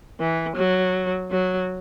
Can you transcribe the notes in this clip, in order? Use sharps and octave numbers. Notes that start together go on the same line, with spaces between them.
E3
F#3
F#3